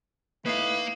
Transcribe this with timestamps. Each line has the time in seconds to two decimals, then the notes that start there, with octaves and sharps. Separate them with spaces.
0.46 A2 A#3 D#4 B4 F5